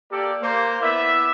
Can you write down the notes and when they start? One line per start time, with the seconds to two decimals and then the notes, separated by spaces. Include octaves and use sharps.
0.11 A#3 G4 A4 A#4 D5
0.42 A#3 C5
0.81 B3 E4 D5 E5